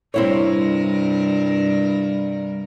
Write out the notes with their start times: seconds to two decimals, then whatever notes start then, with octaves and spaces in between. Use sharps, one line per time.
0.14 G2 C3 G3 C4 E4 A#4 C#5